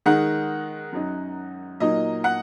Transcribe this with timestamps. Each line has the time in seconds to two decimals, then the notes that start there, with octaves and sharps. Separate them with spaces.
0.06 D#3 G#3 D#4 F#5
0.93 F#2 F#3 D#4
1.80 A#2 F#3 A#3 D#4 D#5
2.24 F#5